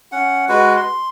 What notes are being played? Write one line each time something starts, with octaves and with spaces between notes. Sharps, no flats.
C#4 F#5
G#3 F#4 B4
C6